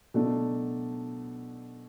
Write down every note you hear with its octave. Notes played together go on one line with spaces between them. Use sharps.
B2 F#3 A3 D4